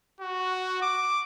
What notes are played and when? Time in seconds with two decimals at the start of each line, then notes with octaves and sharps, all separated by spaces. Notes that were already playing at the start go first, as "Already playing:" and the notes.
0.21 F#4
0.82 D6